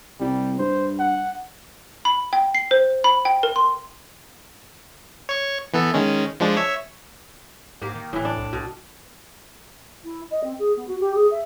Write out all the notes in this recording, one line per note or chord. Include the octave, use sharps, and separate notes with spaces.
C2 G3
G2 C5
F#5
B5
G5
C7
C5
B5
G5
A#4
C6
C#5 C#6
E3 B3 A4
D#3 G#3 C#4
F3 G#3 D4
C#5 E5
G#2 A#3 G4
D#3
D1 A2 E3
D4
C2
C2 B2
E4
D#5
C4
G#4
B3
F#4
G4
G#4
E5